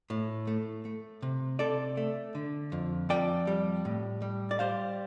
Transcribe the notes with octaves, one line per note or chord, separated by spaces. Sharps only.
A2
A3
A3
C3
C3 A4 D5
A3
D3
F2
F2 D5 G5
G3
A2
G3
D5
G3 C5 F5